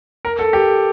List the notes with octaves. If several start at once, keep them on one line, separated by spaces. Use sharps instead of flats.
A#4
A4
G4